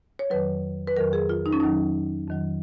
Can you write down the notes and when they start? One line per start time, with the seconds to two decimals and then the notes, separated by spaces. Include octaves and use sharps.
0.19 C#5
0.30 F2 D#3 F#3 B4
0.87 B4
0.96 F2 D#3 F#3 A#4
1.13 G#4
1.29 F4
1.46 D#4
1.53 C#4
1.60 F2 D#3 F#3 D#4
2.28 F2 D#3 F#3